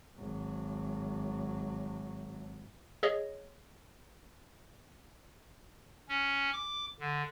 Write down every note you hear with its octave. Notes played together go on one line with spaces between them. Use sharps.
G#1 F#3
G#4 C#5 D#5
C#4
D6
D3